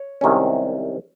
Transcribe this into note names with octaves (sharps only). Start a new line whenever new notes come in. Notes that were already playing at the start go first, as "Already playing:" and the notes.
Already playing: C#5
C2 C3 D#3 G#3 C#4